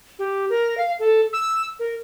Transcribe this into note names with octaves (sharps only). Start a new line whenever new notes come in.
G4
A#4
F5
A4
E6
A#4